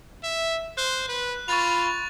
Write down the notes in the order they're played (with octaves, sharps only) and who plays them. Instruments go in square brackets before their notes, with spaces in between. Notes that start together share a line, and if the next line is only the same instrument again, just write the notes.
[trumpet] E5
[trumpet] C5 [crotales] F#6
[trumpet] B4
[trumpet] F4 [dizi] B5 [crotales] C#6 A6 F7